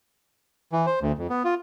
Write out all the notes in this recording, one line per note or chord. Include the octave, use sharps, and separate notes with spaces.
E3
C5
D2
F2
B3
F4